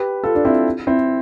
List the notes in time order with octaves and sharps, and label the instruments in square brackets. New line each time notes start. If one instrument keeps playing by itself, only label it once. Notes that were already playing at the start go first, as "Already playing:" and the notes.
Already playing: [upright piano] G4 B4
F4 A4
D4
C4 E4
C4 E4